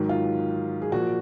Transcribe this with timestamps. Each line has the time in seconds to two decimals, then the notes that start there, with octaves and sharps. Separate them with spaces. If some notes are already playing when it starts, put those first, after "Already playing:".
Already playing: G#2 D#3 F#3
0.09 F4
0.82 G#4
0.92 A#2 F3 F#4